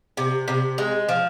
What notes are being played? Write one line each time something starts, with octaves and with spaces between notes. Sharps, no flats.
C3
C3
G#3
F3